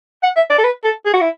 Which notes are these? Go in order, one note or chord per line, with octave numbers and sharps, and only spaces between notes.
F#5
E5
D5
A4
B4
A4
G#4
F#4
E4